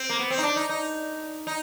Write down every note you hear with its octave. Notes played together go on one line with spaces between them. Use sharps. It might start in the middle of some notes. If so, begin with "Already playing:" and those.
Already playing: C4
A#3
B3
C4
D#4
D4
D#4
D#4
D#4